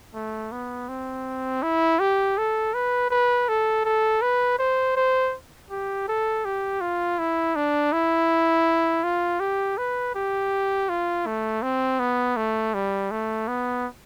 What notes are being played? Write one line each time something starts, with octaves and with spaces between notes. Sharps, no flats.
A3
B3
C4
E4
G4
A4
B4
B4
A4
A4
B4
C5
C5
G4
A4
G4
F4
E4
D4
E4
F4
G4
B4
G4
F4
A3
C4
B3
A3
G3
A3
B3